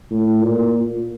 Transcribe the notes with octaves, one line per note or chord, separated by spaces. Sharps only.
A2
A#2